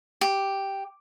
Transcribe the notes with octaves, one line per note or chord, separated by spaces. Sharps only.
G4